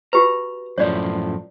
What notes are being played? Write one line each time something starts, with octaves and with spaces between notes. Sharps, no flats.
F#4 G4 B4 A#5
F#2 A2 F3 C#5 D5